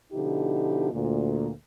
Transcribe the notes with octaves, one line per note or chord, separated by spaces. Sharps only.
B2 D3 F3 D#4 E4 G4
D2 A#2